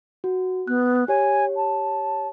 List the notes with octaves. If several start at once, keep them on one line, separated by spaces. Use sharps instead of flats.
F#4
B3 F#6
G4 C#5 G#5
A5